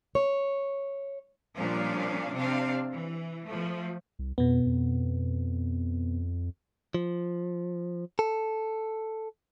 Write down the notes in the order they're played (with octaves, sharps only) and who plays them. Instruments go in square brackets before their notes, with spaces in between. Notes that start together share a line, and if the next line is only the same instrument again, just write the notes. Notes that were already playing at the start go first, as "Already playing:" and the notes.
[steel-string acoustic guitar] C#5
[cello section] A#2 F3 G3 C#4 D4 F5
C3 C4 D4 F5
E3
F3 A3
[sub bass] C2
[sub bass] F2 [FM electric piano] B2 B3
[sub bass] F2
[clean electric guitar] F3
A4